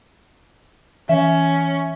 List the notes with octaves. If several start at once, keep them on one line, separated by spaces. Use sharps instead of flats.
E3 C#4 E5